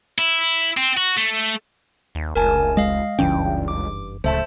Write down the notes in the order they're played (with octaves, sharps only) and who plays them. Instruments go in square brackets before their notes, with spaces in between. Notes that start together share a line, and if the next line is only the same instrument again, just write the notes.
[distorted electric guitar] E4
C4
F#4
A3
[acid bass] D#2
[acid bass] F1 [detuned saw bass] C#2 [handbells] A#4 G#5 A5
[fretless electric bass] G#3 [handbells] D#5 F5
[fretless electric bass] F#1 E3 C#4 [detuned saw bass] C#2 [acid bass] G2 [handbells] G5
[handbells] D6
[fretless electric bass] D1 C#2 [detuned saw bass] A3 [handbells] C5 E5 A5